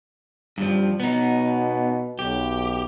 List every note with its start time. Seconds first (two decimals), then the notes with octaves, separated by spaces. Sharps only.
0.58 G2 F3 G3
1.00 B2 B3 D#4
2.19 B1 G4